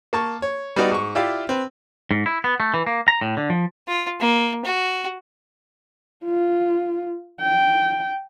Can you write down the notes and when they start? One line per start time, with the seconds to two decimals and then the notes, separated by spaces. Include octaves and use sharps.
0.13 A#3 A5 C#6
0.42 C#5
0.76 G3 B3 D#4 F#4 D5
0.91 G#2 C#6
1.15 E4 F4 G4 D5 E5 F5
1.49 C4 B4
2.11 G#2
2.26 E4
2.44 B3
2.60 A3
2.74 E3
2.87 A#3
3.08 A#5
3.21 A2
3.37 D3
3.50 F3
3.88 F4
4.20 A#3
4.65 F#4
6.25 F4
7.41 G5